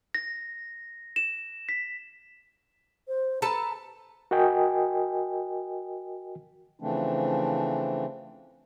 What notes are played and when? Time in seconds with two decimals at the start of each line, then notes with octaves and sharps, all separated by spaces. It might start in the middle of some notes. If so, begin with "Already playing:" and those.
0.14 A#6
1.16 E7
1.69 B6
3.08 C5
3.42 A4 B4 A5 A#5
4.31 F#4 A#4 D#5 G5 G#5
6.80 C#3 E3 F3 A3 C4 D4